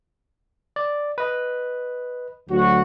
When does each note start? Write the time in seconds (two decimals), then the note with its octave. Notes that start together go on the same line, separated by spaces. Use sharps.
0.76 D5
1.18 B4 D#5
2.50 D2 F#3 F#4